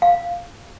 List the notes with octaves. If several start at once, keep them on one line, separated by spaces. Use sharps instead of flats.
F5